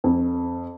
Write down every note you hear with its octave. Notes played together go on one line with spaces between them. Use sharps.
F2